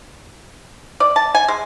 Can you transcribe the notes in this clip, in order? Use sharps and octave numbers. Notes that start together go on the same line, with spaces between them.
D5
A5
G#5
G#3